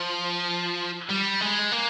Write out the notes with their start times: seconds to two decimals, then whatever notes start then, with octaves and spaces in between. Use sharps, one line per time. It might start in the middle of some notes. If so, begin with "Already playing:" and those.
Already playing: F3
1.09 G3
1.41 G#3
1.72 A#3